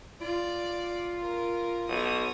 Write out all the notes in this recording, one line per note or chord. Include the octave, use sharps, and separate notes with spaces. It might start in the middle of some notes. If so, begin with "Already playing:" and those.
F4 D5
A#4
B1 C#5 D#6